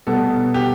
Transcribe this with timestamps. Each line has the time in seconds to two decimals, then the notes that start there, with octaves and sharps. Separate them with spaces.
0.07 B2 G3 B3 A4
0.54 G4